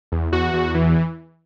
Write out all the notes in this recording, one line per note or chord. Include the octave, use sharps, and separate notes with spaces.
E2
E2 F#4
E2
E3